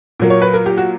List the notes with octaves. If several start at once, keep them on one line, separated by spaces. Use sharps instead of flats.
A#2 F#3 A#3
C#5
B4
A#4
G4
F#4